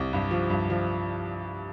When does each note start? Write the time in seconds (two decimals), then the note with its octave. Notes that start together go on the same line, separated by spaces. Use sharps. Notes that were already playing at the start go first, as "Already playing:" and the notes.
Already playing: C2
0.13 G2
0.31 F3
0.50 G2
0.70 F3